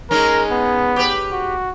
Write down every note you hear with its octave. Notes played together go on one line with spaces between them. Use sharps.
G#3 C#4 D#4 A#4
B3
G4 B4
F#4